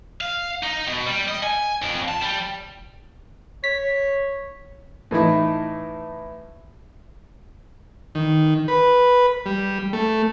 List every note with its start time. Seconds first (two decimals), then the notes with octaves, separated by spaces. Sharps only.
0.21 F5
0.63 D#4
0.87 B2
1.06 G3
1.28 D#5
1.43 G#5
1.82 F2
2.08 A5
2.22 G3
3.64 C#5 B6
5.11 A2 E3 D#4 E4
8.15 D#3
8.68 B4
9.46 G3
9.93 A3